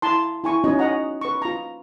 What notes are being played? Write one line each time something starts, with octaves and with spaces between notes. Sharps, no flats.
E4 A5 A#5 C6
E4 G#5 C#6
C#4 D#4 F#4 C#5 D#5
C#5 D#5 F#5 A#5
B4 C#6
F4 A#5